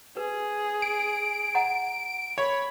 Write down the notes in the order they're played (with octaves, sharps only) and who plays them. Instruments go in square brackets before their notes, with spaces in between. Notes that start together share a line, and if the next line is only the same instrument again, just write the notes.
[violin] G#4 [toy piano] B4
[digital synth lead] D7
[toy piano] D#5 F#5 A#5
[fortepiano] C#5 [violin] B5